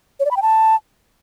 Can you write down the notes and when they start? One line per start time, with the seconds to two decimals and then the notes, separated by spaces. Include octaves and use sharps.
0.20 C#5
0.25 D5
0.31 B5
0.37 G5
0.42 A5